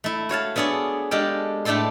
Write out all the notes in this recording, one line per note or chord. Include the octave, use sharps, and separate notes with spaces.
A3 E4
F#4 C#5 F5 A5
B3 D4 G#4 A4 C#5
G#3 D4 G4 A4 F5 G5
A2 A3 D4 G4 A4 C6